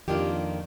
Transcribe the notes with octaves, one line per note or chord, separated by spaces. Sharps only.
F2 D#3 A#3 D4 F4 G4